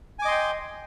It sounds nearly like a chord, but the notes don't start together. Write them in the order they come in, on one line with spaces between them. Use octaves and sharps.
G#5 D6 D#5 C6 G5